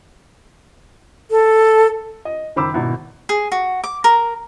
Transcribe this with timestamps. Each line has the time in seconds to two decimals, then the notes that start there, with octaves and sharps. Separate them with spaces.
1.31 A4
2.25 D#5
2.56 F#1 D#3 C5 B5 D6 E6
2.73 G#1 B2 E4
3.29 G#4
3.52 F#4
3.84 D6
4.04 A#4